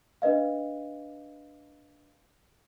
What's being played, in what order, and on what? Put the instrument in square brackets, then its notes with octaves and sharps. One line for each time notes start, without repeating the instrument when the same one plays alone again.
[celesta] D4 B4 D#5 F5